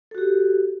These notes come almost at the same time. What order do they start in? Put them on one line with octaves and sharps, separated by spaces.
A4 F#4 G4